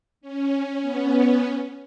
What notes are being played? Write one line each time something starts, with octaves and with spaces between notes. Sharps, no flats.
C#4
B3
C#4